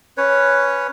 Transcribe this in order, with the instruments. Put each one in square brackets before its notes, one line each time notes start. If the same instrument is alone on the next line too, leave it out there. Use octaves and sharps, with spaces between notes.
[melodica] C#4 B4 C#5